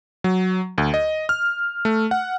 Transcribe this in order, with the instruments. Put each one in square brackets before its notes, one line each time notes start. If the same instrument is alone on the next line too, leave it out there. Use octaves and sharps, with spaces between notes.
[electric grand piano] F#3
D2
D#5
F6
A3
F#5